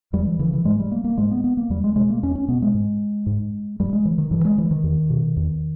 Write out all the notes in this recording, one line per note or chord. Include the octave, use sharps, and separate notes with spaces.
E2 G3
E3
C#3 E3
E3
G#2 G#3
G3
A#3
A#3
G#2 G#3
B3
B3
A#3
E2 G3
G#3
B2 G#3
A#3
E2 C#4
C#4
B2 B3
G#3
G#2
G#2
G2 G3
G#3
E3
D#3
G2 E3
G#3
E3
D#3
E2
B2
E2